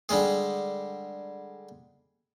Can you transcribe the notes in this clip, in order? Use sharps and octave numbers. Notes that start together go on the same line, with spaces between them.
D3 G3 G#3 G#4